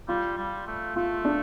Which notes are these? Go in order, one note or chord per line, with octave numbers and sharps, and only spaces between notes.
G3 F4
G3
A3
A3 F4
D4